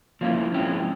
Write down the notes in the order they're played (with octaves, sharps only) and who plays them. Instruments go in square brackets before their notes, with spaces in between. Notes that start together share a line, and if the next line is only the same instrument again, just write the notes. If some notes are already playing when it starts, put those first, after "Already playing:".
[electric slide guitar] F3 G#3 C#4 E4 [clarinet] A#3
[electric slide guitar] F3 G#3 C#4 E4 [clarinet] C4